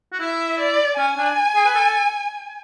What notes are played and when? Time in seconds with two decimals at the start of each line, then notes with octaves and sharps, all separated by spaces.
0.13 F#4
0.20 E4 E5
0.59 D5
0.97 C#4 G#5
1.17 D4
1.55 G#4
1.66 B4
1.75 A4